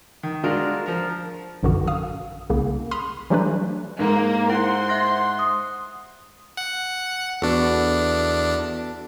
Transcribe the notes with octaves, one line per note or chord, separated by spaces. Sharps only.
D#3
D3 G#3 D4 F4 F#4 A#4
F3 A#4
A#1 F#2 D3 D#3 F#4
F5 D#6 F6
C2 C#3 A#3
B5 C6 D#6 F6
E3 F#3 G3 A3 D4 B4
G#2 A#3
E4 C5 F#5 C6
E5 F#6 A#6
D#6
F#5
E2 B3 D4 F#4 A4